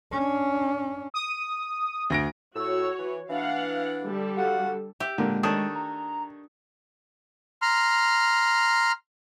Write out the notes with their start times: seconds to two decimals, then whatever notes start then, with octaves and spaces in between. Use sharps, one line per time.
0.12 C#4 D4
1.14 D#6
2.10 D2 A#6 D7
2.55 A2 F#4 C#5 E6
2.98 E3
3.29 E3 D4 F5 F#5
4.03 D3 G3 A4
4.37 F#4 F5 F#5
5.00 G4 E5
5.18 A#2 D3 G#3 A#3
5.43 D#3 A3 D4 C#5 D#6
5.75 A#5
7.62 A#5 C6 F6